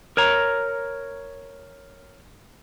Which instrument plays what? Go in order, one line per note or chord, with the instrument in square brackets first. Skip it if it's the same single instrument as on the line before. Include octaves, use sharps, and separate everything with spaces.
[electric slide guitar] A#4 C#5 A#5